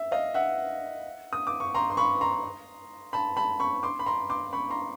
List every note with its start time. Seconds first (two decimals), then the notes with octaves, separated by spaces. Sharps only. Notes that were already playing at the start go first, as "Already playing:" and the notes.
Already playing: E5
0.12 D#5 F5
0.34 E5 F#5
1.33 D#6
1.47 D6
1.60 C#6
1.75 A#5 C6
1.90 C6
1.97 B5 C#6
2.21 A#5 C6
3.13 A5 B5
3.37 A5 B5
3.60 B5 C#6
3.83 C6 D6
3.99 B5
4.06 A#5 C6
4.30 C6 D6
4.53 B5 C#6
4.70 A#5 C6